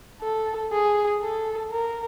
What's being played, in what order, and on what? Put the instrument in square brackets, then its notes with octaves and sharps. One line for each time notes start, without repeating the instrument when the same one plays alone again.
[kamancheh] A4
G#4
A4
A#4